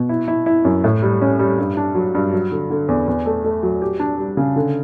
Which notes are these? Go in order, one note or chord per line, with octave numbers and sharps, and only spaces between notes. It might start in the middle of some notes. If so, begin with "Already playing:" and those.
Already playing: B2
E4
E4
E4
F#2
A2
G3
C#4
G3
G2
D4
F#3
G2
F#3
D3
D3
E2
E2
A3
A3
F#3
G4
D4
G3
C#3
D3